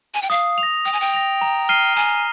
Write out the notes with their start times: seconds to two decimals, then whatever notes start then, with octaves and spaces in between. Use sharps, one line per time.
0.14 G#5
0.22 G5
0.30 F5 D#6
0.58 F7
0.63 A#6
0.85 G5 D#6
0.93 G#5
1.01 G5
1.14 A#6 F7
1.41 A#5
1.69 F6 C7 D#7 G7
1.96 G#5 A#5